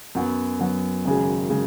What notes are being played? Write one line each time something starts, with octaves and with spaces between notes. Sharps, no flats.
F#2 F#3 B3
F#2 F#3 B3
G#1 F#2 C#3 G#3
C#3 G#3